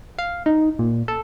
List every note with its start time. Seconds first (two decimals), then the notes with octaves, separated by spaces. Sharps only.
0.18 F5
0.46 D#4
0.79 A#2
1.08 A4